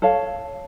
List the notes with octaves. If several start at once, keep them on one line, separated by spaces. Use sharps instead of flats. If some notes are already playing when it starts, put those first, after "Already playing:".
A4 C#5 F5